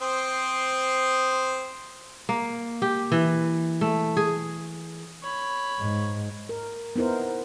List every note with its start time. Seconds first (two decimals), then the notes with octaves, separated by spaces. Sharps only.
0.01 C4 C5 D#6
2.29 A#3
2.82 G4
3.12 E3
3.81 A3
4.17 G#4
5.23 C#5 B5
5.77 G#2
6.49 A#4
6.96 B3 D#4 E4 A#4 C5